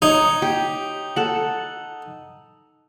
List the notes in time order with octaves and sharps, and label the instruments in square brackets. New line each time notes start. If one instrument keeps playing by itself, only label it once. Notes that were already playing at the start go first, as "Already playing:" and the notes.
[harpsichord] D#4 [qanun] C#5
[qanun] G4
A4 F#5